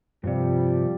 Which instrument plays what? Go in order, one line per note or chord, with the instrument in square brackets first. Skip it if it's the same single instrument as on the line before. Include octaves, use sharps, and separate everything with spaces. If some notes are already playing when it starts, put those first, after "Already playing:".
[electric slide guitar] G2 C3 [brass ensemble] F3 G3